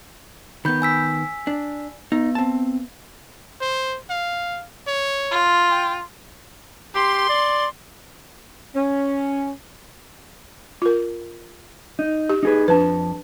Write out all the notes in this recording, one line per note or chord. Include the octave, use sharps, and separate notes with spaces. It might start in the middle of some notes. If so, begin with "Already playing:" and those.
D#3 B3 B5 G6
G#5 E6 B6
D4
B3 D#4
C4 A5
C5
F5
C#5
F4
G5
G4 C6
D5
C#4
F4 A#4
D#4
G4
D#4 G#4 B4
F2 D4 B4 A5